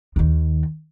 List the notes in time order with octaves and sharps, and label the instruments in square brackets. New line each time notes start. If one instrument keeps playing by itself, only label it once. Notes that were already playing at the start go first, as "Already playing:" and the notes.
[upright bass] D#2 D#3